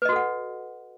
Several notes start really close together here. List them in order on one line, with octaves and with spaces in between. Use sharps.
B4 D#5 F#4 A4 F#5